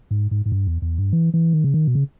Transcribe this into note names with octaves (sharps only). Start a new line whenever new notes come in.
G#2
G#2
G#2
G2
E2
E2
G2
E3
E3
D#3
C#3
D#3
B2
C#3